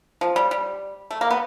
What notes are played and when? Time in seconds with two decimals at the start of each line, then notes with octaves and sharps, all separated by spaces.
0.21 F3
0.36 G3
0.51 G3
1.11 A3
1.21 A#3
1.31 B3